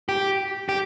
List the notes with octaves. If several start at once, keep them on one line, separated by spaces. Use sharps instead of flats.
G4
G4